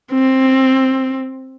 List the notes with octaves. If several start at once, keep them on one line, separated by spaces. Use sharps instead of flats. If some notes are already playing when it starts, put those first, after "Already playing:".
C4